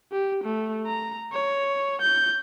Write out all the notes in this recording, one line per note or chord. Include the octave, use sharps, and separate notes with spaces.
G4
A3
A#5
C#5
G6